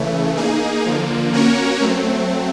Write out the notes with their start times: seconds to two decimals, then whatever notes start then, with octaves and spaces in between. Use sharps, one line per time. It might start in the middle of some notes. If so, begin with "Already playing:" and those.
Already playing: C#3 E3 A3
0.37 A#3 D#4 G#4
0.85 D3 F3 A#3
1.33 A#3 C#4 F#4 A#4 C#5
1.80 F#3 A3 C4